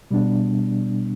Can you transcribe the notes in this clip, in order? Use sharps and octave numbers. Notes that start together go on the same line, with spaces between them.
B2 G3 B3 D4